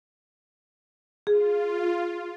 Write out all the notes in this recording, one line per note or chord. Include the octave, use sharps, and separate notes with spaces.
F4 G#4